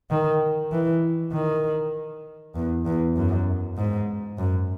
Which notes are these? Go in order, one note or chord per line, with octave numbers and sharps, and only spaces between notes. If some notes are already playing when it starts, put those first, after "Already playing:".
D#3
E3
D#3
E2
E2
F#2
G#2
F#2